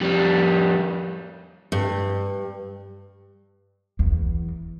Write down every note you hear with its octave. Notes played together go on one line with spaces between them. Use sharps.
F2 G3
G2
E2